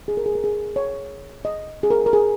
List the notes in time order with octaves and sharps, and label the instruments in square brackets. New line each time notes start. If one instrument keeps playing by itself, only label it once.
[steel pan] G#4
A#4
G#4
A#4
G#4
C#5
D#5
G#4
A#4
A#4
G#4